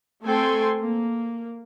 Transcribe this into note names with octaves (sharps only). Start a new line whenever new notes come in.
A3 C4 A4 G5 G#5 C6
A#3